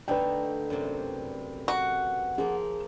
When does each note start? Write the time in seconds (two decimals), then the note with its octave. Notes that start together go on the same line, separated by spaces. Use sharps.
0.08 D3 A3 D#4 B4 D5 G5
0.70 F#2 C3
1.68 F#4
2.38 F3 A#3 G#4